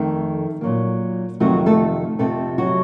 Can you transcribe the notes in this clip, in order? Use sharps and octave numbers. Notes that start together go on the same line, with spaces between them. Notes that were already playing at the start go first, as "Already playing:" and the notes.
Already playing: F2 D#3 A3 A4
A#2 F#3 A#3
F2 C3 D#3 F#3 A3 F#4
A3 A4
F2 C3 F3 A3 A4
F#3 F#4